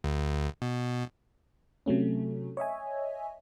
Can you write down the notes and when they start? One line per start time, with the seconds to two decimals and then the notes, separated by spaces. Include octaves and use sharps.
0.04 D2
0.62 B2
1.86 C3 F#3 A3 C#4
2.57 C#5 D#5 E5 G#5